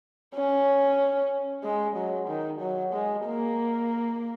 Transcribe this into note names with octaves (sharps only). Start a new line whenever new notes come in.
C#4
G#3
F#3
D#3
F#3
G#3
A#3